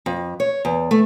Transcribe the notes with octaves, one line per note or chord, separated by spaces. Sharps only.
F2
C#5
E2
A3